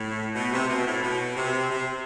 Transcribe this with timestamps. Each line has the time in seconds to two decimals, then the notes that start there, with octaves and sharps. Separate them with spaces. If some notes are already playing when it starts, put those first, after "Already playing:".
Already playing: A2
0.33 B2
0.51 C3
0.68 B2
0.85 A2
1.02 B2
1.36 C3
1.70 C3